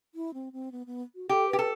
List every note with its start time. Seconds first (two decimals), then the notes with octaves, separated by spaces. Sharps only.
0.15 E4
0.34 C4
0.53 C4
0.72 B3
0.86 B3
1.15 F#4
1.29 G4 A4
1.49 G4 B4
1.59 A4